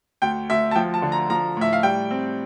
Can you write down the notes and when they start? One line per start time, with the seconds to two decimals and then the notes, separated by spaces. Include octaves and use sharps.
0.22 D2 G5
0.50 D2 E5
0.71 A5
0.75 F3 G5
0.94 A5
1.02 D3
1.12 A#5
1.30 F3 A#5
1.57 A2 E5
1.73 F5
1.83 G3 G5
2.11 C4